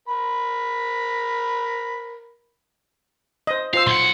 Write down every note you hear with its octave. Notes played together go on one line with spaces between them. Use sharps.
A#4 B5
C5 D#5
F4 C5 F5 E6
B1 F#5 C6